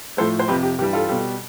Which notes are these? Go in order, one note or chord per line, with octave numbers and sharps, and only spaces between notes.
A2 F3 A3 A4 C5
C5
F2 C3 F3 G4 B4
G4
G2 E3 G3 G4
F4 A4
B2 G3